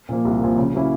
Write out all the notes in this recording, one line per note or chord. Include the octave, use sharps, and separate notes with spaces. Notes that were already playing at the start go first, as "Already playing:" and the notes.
A#2 F3 A#3
C2
A#2 F3 A#3
C#3
F#3 A#3 C#4 E4